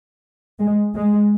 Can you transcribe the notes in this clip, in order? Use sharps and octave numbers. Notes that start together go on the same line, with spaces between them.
G#3
G#3